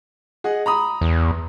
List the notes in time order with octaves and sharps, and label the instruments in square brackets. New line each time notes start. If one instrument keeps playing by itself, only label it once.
[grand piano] G#4 D#5 F#5
A#5 B5 D#6
[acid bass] E2